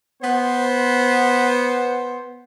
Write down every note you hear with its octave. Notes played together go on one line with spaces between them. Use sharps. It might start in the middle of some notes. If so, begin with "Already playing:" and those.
B3 C5